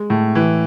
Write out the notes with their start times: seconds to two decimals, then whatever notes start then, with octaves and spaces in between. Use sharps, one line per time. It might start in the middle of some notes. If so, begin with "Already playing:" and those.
Already playing: G#3
0.10 A2
0.35 E3